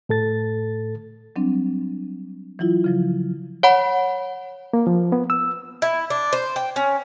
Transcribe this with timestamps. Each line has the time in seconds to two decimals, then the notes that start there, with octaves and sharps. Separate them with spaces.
0.09 A2 A4 A6
1.36 F#3 G3 C4 D4
2.59 E3 F#3 E4 F4
2.84 C#3 F3 F#3
3.63 C#5 F#5 B5
4.74 A#3
4.87 F3
5.12 B3
5.30 E6
5.82 E4
6.10 D4
6.33 C5
6.56 G5
6.76 C#4